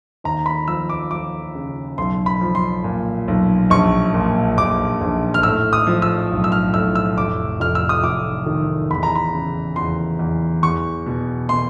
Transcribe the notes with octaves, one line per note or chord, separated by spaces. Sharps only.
D#2 A#5
B5
F3 E6
D6
F3 D6
C#3
B1 C6
B5
F3
C6
A#2
B1
A#1 C#6
A#2
A#2 D6
A#1
F6
A2 E6
D#6
F3
E6
B1
E6
F6
A2 E6
E6
F1 D6
F1 F6
E6
D#6
F1 D6
D#3
E2 B5
A#5
B5
C#3
E2 C6
E2
E2 C#6
B2
B2 C6